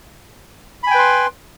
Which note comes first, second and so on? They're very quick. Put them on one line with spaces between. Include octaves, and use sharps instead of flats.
B5 G#5 G5 B4 C6